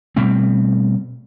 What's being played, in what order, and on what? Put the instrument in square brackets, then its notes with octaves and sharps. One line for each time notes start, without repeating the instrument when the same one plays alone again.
[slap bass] B2 G3 A3 C4